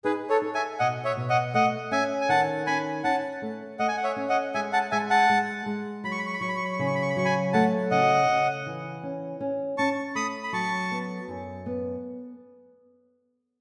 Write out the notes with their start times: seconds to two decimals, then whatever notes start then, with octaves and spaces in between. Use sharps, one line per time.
0.04 D#4 G#4 B4
0.29 A4 C#5
0.42 D#4
0.54 E5 G#5
0.79 B2 D#5 F#5
1.05 C#5 E5
1.17 B2
1.29 D#5 F#5
1.54 A3 D#5 F#5
1.91 C#4 E5 G#5
2.21 G#5
2.29 D#3 F#5 A5
2.66 C#4 G#5 B5
3.04 C#4 F#5 A5
3.42 A3
3.79 A3 D#5 F#5
3.88 G#5
3.97 F#5
4.04 C#5 E5
4.16 C#4
4.29 D#5 F#5
4.54 G#3 E5 G#5
4.72 F#5 A5
4.91 G#3 E5 G#5
5.10 F#5 A5
5.30 G#3
5.66 G#3
6.04 F#3 B5
6.12 C#6
6.19 B5
6.27 C#6
6.34 B5
6.41 F#3 C#6
6.49 B5
6.57 C#6
6.65 B5
6.72 C#6
6.79 C#3 B5
6.87 C#6
6.95 B5
7.02 C#6
7.10 B5
7.17 F#3 C#6
7.25 G#5 B5
7.53 A3 F#5 A5
7.91 C#3 D#5 F#5
8.28 C#3
8.66 E3
9.03 C#4
9.40 C#4
9.78 C#4 A5 C#6
10.15 A3 B5 D#6
10.44 B5
10.53 F#3 A5 C#6
10.91 B3
11.28 F#2
11.66 B3